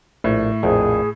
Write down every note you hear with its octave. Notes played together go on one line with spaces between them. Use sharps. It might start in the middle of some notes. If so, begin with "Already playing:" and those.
A#1 A2
A#1 F2 G#4